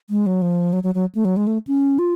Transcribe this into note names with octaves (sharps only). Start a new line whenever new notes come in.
G#3
F#3
F3
F#3
F#3
F#3
A3
F#3
G#3
A3
C#4
F4